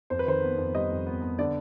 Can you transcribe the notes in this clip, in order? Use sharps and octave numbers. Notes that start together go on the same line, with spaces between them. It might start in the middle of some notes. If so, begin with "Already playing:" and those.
F2 C5
B4
D#3 C5
B3
F2
G3 D#5
F2
B3
B3
D3 D5